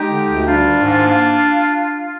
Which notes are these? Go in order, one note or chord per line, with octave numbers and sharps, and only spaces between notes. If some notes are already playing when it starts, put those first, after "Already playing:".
Already playing: G#3 D#4 G4
D3
D2
G3 D4 F4
D#3
G#2
A#3